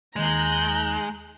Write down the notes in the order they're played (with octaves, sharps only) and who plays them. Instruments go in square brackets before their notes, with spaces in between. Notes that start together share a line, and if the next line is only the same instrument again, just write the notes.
[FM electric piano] D#2 D#4 G#5 [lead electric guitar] G#3 [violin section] A#5 F#6 G6